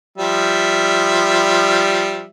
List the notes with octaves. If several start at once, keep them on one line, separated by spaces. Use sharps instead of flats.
F3 G3 E5